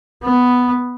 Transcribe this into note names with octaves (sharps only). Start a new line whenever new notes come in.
B3